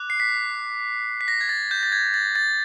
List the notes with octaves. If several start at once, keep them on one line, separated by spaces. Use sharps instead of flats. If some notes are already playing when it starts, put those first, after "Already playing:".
Already playing: D6 F#6
C7
B6
B6
A#6
G#6
A6
G6
A6
G#6
A6
A6